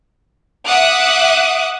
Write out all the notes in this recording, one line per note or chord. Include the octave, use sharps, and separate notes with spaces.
E5 F#5 D6 D#6 F#6